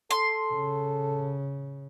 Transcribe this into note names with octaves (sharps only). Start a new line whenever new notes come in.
A4 C6
C#3